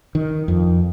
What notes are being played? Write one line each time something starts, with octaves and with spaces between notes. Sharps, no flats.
D#3
F2